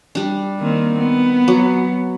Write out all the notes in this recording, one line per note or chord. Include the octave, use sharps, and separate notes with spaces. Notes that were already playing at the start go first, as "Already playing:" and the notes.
G3 D4
D#3 A#3 C4
B3
F#3